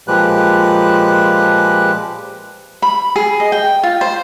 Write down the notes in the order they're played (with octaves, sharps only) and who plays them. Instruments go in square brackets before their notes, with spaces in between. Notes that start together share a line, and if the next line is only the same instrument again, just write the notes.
[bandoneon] A#2 F3 G#3 G4 B4 F#6
[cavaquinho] B5
G#4
D#5
G5
F4
C5